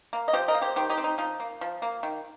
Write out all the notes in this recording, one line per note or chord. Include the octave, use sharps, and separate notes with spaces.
A#3
D#5
F3 G4 C5
A#4 D#5
A#3
G4 C5
D#3 G4 C5
D#4 G4
C4
D#4
F3 D#4
A#3
F3
A#3
D#3